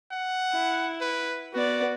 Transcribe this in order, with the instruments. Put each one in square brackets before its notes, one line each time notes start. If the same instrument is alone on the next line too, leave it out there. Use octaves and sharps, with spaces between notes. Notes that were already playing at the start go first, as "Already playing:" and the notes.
[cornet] F#5
[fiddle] E4
[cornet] B4
[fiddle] B3 D5 [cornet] F#4